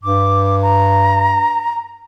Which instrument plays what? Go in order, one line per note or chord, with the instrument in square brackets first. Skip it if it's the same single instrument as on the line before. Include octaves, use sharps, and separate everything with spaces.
[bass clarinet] G2 [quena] D6
[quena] A#5